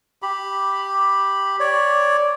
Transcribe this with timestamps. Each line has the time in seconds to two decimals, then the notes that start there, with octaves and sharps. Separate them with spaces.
0.22 G4 B5
1.60 C#5 D5